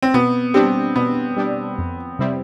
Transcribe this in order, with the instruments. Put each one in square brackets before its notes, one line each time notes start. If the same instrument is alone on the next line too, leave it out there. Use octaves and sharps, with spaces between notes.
[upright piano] C4
[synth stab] B2 [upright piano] B3
[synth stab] G3 D4 G4 [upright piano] C4
[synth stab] B2 [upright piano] B3
[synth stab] G3 D4 G4
F2
C3 G3 C4 E4